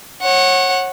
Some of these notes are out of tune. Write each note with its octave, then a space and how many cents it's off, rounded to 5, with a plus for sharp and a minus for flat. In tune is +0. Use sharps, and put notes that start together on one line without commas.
C#5 -30 F#5 +0